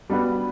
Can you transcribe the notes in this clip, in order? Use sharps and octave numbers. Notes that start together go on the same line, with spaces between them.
G3 B3 D4 F#4 B4